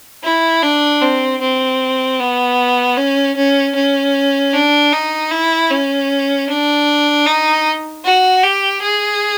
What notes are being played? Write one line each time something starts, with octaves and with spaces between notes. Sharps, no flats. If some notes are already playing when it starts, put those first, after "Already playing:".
E4
D4
C4
C4
B3
C#4
C#4
C#4
D4
D#4
E4
C#4
D4
D#4
F#4
G4
G#4